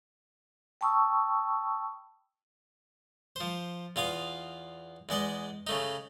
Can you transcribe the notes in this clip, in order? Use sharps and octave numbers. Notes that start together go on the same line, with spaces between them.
G5 A5 B5 C#6 D#6 E6
F3 C5
E2 F4 F5 D#6
E2 G#3 D5 D#5
C#3 A3 D#4